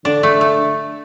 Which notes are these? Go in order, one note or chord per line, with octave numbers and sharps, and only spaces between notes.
D3 D4
A3
A3